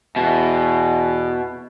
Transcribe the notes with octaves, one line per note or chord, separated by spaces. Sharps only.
E2 B2